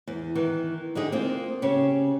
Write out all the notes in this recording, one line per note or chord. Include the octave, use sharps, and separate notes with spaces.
E2
D#3 E3
D3 D#4 G4 G#4
A#3 C4 F4
C#3 C#4 G4